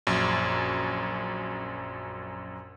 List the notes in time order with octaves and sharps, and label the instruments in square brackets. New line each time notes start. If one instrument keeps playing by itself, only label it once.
[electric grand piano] A#1 F#2